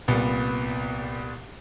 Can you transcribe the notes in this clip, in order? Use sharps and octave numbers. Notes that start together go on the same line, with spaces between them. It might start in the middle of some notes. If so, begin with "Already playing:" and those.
C2 A#2 B3